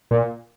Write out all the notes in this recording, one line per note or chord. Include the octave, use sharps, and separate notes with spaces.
A#2